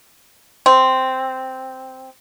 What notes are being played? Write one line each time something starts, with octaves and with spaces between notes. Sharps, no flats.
C4